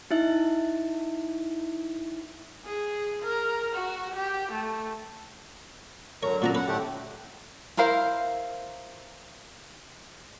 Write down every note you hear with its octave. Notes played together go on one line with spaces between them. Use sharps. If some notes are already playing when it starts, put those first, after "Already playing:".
D#4 E4 E5
G#4
A#4
F#4
G4
A3
D3 F#3 A#4 C#5 A#5
A#2 C4 C#4 F#4 D5 A#5
B4 F#5
A2 D3 A3 G4 F#5
E4 A#4 C5 F5